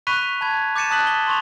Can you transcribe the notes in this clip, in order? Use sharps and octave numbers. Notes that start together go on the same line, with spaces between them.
B5 C#6 F#6 B6 D#7 F7
A5 B5 G#6
D6 G6 A6 C#7 D#7 E7
A5 D#6 F#6 B6 F#7
G7
C6 C#6 F7